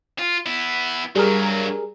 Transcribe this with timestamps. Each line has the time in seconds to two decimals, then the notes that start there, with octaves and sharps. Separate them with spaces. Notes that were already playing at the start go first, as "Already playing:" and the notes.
0.19 F4
0.46 B3 E4
1.16 G2 F#3 G3 G#4 A#4